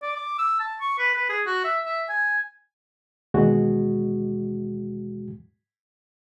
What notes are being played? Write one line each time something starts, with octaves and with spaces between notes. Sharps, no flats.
D5
D6
E6
A5
C#6
B4
B4
G#4
F#4
E5
E5
G#5
D#2 B2 E3 G#3 F#4